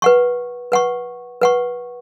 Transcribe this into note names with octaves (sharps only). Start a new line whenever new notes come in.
B4 F#5 C#6
B4 F#5 C#6
B4 F#5 C#6